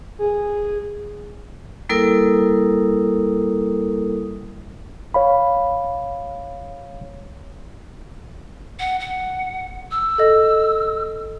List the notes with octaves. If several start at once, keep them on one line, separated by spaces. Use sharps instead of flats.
G#4
G3 A#3 E4 A4 A#4 D#6
C#5 F5 B5
F#5
F#5
E6
A4 D#5